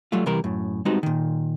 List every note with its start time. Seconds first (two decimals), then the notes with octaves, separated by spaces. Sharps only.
0.12 F#3 G3 A3 F4
0.26 C3 E3 G3 A#4
0.44 F#2 A2
0.85 G3 G#3 B3 C4 D#4 F#4
1.03 A#2 D#3